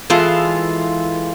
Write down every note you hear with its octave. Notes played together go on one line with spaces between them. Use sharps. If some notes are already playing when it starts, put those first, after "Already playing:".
E3 G#3 F4 A4